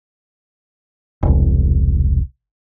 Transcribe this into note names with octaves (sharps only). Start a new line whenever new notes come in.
E1 C2